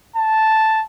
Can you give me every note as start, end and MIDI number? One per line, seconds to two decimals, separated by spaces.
0.16 0.82 81